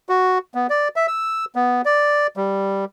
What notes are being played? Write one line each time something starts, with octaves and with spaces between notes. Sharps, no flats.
F#4
B3
D5
E5
E6
B3
D5
G3